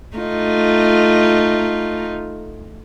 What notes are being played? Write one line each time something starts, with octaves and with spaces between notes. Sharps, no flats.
A3 D#4 F4